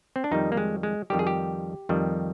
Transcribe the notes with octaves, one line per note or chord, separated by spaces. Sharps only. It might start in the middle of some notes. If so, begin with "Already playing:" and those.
C4
D4
F2 D#3 G3 D#4
A#3
G#3
G#3
F2 D#3 G3 G4
G#4
G4
F2 D#3 G3